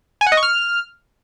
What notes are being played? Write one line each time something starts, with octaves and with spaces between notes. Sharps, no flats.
G#5
F#5
D#5
C#6
F6